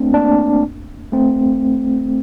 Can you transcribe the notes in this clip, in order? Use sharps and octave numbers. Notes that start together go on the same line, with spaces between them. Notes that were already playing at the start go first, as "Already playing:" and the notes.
Already playing: A3 C4 D4
A#3 D4
A3 C4